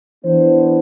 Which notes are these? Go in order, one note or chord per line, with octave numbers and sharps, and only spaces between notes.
E3 B3 D4 C5